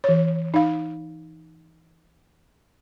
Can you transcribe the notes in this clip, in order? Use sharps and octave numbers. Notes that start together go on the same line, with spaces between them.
E3 C#5
D#4 F5